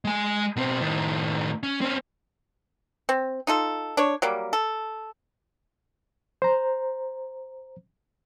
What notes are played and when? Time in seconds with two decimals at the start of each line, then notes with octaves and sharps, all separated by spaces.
0.05 G#3 G#5
0.56 B2 C4
0.81 A2 D#3
1.63 C#4
1.81 C4 C#4
3.09 C4
3.47 D#4 F4 A4
3.97 D4 C#5
4.22 F#3 G3 A#3
4.53 A4
6.42 C5 A#5